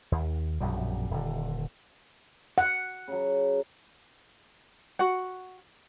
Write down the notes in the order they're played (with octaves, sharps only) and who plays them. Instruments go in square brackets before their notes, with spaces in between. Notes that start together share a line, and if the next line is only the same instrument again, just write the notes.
[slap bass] D#2
A#1 F#2 B2 G3
D#1 D3
[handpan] F#5
[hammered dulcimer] C#3 F#3
[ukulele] F#4 F#5